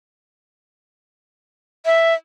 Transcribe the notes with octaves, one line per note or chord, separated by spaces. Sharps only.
E5